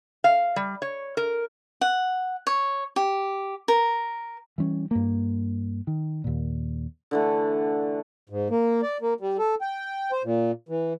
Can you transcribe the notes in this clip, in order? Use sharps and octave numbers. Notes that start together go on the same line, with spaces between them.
F5
G3
C#5
A#4
F#5
C#5
G4
A#4
E3 G3 C4 C#4
G2 A#3
D#3
D#2 A#2
D3 E3 A3
G#2
A#3
D5
A#3
G3
A4
G5
C5
A#2
E3